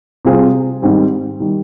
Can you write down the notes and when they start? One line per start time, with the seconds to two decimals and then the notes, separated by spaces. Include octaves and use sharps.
0.25 C3 G3 C4 F4 G#4
0.82 G#2 D#3 G3 C4
1.40 D#3 G3